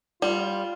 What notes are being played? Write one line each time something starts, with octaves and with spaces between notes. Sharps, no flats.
G3 F4